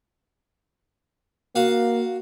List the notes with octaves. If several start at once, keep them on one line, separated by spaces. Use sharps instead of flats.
A#3 F#4 F5